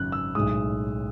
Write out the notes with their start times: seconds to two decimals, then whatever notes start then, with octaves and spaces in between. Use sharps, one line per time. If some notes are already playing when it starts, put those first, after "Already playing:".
Already playing: G#1 F#2 C#3 F#3 F#6
0.12 E6
0.35 B1 A2 G#3 D#6